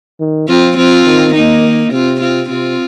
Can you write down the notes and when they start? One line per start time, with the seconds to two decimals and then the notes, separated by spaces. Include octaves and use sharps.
0.20 D#3
0.48 F3 C4 F4
0.77 F3 C4 F4
1.06 D#3
1.35 A#3 D#4
1.92 C3 C4 F4
2.21 C4 F4
2.49 C3 C4 F4